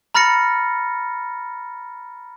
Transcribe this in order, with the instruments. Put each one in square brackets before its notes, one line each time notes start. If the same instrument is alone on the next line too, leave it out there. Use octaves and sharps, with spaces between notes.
[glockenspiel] A#5 B5 F6 A6 A#6 C#7